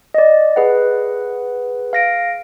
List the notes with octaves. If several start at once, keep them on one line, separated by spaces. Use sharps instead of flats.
D5 D#5
G#4 B4 F#5
F5 A#6 D7